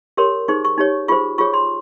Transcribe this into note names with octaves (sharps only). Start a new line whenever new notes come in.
G4 A#4 C#5 C6
D#4 G#4 C5 C#6
C#6
D#4 G4 C#5
F4 G#4 C5 C#6
F4 G#4 C#5 C#6
C6